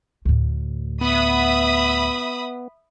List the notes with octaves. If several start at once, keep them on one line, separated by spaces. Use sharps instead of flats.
D2 A2
B3 E5 B5 D#6